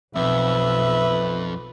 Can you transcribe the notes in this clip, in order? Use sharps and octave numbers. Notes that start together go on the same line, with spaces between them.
B1 F2 B4 E5